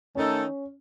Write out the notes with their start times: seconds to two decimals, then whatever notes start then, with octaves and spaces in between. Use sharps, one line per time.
0.15 D#3 A3 C#4 D#4 A4